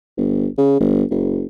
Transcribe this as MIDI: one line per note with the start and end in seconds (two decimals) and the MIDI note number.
0.17 0.47 31
0.58 0.80 49
0.80 1.03 31
1.10 1.47 30